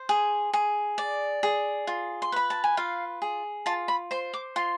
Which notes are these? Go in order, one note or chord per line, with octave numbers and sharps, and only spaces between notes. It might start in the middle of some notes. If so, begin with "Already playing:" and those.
Already playing: C5
G#4
G#4
D5
G#4
F4
C6
B4 B5
A5
G#5
F4 F5
G#4
F4 A5
B5
C5 C6
D6
F4 C6